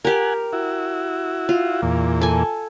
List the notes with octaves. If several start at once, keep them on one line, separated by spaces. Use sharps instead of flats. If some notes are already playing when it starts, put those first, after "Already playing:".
G4 A#4 F#5 G#5
E4 F#4
F4
E2 A#2
A4 G#5